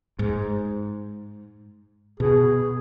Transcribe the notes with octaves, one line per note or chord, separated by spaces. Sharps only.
G#2
B2 G#4